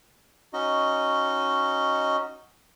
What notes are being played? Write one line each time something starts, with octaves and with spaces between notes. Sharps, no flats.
C#4 D#4 F#4 D#5